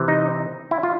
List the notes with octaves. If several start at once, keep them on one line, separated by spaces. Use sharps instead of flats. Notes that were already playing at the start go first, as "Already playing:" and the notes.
Already playing: C3 E3
D#4
E4
F4